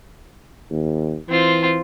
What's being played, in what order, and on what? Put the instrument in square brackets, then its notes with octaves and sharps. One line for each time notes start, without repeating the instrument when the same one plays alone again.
[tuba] D#2
[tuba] E3 [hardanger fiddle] C4 F4